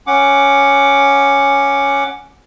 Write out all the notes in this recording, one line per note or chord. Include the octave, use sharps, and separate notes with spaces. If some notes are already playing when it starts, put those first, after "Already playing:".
C#4 F#5 D6